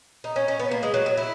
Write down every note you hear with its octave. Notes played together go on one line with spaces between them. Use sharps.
D#4
C#4
C#4
B3
A#3
G#3
F#3
F#3
E4